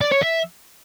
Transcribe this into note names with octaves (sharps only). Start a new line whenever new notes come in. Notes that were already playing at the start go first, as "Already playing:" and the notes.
D5
C#5
E5